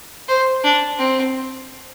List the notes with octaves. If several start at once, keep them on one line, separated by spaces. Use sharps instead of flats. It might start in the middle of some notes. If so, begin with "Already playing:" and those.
C5
D4
C4